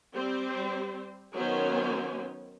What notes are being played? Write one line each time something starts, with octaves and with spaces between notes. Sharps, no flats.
G3 C4 C5
D#3 F#3 B3 C#4 C5 G#5